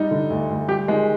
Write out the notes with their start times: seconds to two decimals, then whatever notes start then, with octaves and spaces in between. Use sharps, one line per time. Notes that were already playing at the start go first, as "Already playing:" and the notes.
Already playing: G3 D#4
0.11 D3
0.30 D2
0.50 D2
0.68 G3 G4
0.88 D#3 G#3